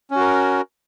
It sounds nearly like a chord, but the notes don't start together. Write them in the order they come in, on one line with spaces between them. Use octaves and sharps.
C#4 F#4 A#4